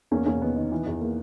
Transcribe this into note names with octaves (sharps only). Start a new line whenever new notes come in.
E2 A#3 C#4
E2 A#3 C#4
D#3 B3
D#3
E3
E2
A#3